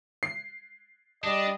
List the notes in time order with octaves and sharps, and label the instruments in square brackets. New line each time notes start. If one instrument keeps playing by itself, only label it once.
[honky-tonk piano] C7
[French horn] G3 [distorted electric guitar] D4 [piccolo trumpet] D#5